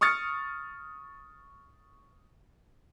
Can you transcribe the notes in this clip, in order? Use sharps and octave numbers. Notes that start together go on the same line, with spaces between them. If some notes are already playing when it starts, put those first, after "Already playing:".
C#6 D#6 F6 A6 C#7